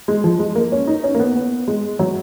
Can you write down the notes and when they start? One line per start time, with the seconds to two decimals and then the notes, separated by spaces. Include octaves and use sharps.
0.08 G#3
0.24 F3
0.39 G#3
0.55 A#3
0.72 C#4
0.87 D#4
1.04 C#4
1.15 A#3
1.19 B3
1.36 B3
1.68 G#3
1.99 F#3